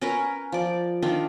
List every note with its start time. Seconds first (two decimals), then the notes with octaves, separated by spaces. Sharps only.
0.01 C#4 A#4 B4
0.52 F3 D5
1.02 D#3 D4 F4